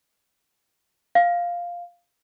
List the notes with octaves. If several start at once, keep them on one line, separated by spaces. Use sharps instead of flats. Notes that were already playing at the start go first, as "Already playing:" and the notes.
F5